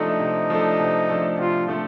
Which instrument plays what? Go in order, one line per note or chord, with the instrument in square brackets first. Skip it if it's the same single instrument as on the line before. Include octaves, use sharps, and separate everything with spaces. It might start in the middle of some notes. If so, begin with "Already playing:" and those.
Already playing: [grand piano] C3 F3 A3 D4 A4 [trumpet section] D#4
[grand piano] C3
F3 A3 D4 A4
C3
F3 A3 D4 A4
[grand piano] C3 [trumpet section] F4
[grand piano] F3 A3 D4 A4